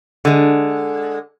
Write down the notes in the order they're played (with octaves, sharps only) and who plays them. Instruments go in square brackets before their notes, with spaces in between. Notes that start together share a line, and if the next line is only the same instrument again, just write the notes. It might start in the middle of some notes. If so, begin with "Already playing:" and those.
[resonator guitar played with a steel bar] D3 G#3